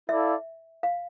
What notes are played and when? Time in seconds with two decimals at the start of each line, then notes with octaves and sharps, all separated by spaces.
0.09 E4 A4 D5 E5 F5
0.83 F5